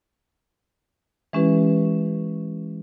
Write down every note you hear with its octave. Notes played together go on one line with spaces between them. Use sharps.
E3 G#3 C#4 E4 G4 B4